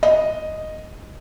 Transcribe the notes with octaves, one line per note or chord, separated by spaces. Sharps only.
D#5